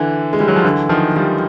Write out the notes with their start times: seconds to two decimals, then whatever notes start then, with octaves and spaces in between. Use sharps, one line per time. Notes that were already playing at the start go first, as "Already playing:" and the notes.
Already playing: D3 E3
0.33 G#3
0.40 G3
0.48 F#3
0.56 F3
0.64 D3 E3
0.89 D#3 F3
1.16 F3 G3